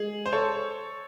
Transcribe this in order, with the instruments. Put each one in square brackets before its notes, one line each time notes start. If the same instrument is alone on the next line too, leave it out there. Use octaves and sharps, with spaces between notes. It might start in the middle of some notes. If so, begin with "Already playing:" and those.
Already playing: [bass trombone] G#3 [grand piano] G#4
[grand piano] C5
A4 C#5